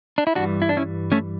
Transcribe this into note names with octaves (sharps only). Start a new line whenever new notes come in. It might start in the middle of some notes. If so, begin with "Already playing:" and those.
D4
E4
G2 E3 G3 D4 F#4
E4
D4
C#4 E4
A3 C#4